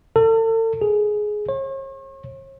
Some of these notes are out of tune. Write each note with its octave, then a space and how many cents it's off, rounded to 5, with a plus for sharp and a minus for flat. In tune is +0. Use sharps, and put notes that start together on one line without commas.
A4 +40
G#4 +15
C#5 -40